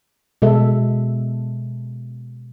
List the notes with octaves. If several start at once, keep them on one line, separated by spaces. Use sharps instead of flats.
B2 G#3 A4 E5